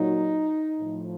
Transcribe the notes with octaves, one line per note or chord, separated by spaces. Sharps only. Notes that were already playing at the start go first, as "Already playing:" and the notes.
Already playing: A#2 F#3 D#4
A2 F3